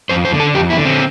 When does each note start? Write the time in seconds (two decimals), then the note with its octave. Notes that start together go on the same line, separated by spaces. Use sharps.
0.09 F2 C5
0.25 C5
0.33 D3
0.40 A4
0.55 F2 G4
0.70 E4
0.78 D3
0.85 C4